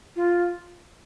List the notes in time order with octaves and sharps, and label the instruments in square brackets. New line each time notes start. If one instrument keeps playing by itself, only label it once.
[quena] F4